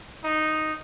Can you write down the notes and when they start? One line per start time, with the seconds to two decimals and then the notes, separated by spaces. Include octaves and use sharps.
0.24 D#4